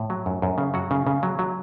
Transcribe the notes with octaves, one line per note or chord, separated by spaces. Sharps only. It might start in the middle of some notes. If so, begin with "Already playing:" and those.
Already playing: A2
F#3
F#2
F#2
C#3
F#3 F#4
C#3
C#3
F#3
F#3